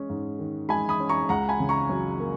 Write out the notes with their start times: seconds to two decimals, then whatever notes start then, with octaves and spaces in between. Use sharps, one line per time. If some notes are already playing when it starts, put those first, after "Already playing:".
Already playing: G#3 C#4
0.10 G#2
0.39 D#3
0.69 G#3 G#5 B5
0.89 B5 D#6
1.00 C#4
1.09 A#5 C#6
1.29 C#2 F#5 A#5
1.49 G#5 B5
1.60 C#3
1.69 A#5 C#6
1.89 F#3
2.20 A#3